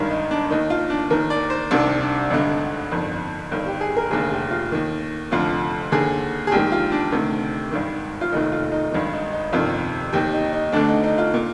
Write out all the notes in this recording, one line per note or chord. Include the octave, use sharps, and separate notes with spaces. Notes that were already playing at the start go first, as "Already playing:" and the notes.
Already playing: G#1 G2 D#3 A#4
D#4
D4
D#2 D#3 D#4
F4
D4
D#2 D#3 A#4
D5
C5
C2 C3 D#3 D4
D4
G#1 G2 D3 D#4
G1 F2 D#3
G1 G2 D#3
G4
G#4
A#4
F1 D#2 D3 G#4
G4
F4
D#2 D#3
F1 F2 D3 F4
D#2 D3 G#4
G#4
A#1 G#2 D#3 G4
F4
D4
D2 C3 D#3
G#1 G2 D#3
F4
F1 D#2 D#3 D#4
F4
D#4
G#1 G2 D#3
D#4
D#4
G1 F2 C3 D#3 F4
D#2 D#3 G4
D#4
D#4
D2 D3 D4
D#4
D#4
F4
A#2